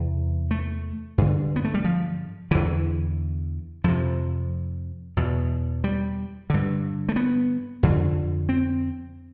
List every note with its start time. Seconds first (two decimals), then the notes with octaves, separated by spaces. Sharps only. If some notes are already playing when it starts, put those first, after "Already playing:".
Already playing: E2 C3
0.51 A3
1.18 G2 D3
1.56 B3
1.64 A3
1.74 G3
1.84 F3
2.51 E2 D3 E3
3.84 F2 C3 F3
5.17 E2 B2
5.84 G3
6.50 G2 D3
7.09 A3
7.16 B3
7.83 F2 D3
8.49 C4